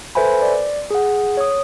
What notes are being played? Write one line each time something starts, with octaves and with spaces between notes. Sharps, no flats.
A4 B4 C5 E5 G#5 B5
D5
G#4 F#5
C#5 D#6